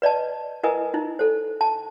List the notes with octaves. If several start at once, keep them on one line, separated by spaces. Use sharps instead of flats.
B4 D5 D#5 A5
E4 A#4 B4 D#5 G#5 D#6
D#4 E4
A4 C5
A5